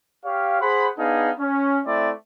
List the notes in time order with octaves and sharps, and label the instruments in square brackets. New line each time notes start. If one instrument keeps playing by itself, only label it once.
[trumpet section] G4 C#5 F5
G#4 C5 F#5 B5
B3 D4 D#4 G#4 F5
C#4
A3 C4 E4 D5 E5